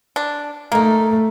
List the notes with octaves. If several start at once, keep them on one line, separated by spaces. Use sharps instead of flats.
D4
A3 A#3 D#4